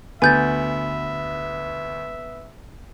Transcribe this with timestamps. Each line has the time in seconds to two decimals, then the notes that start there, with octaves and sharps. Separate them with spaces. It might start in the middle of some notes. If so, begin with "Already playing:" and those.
0.22 D2 B3 E5 G#5 G6 A6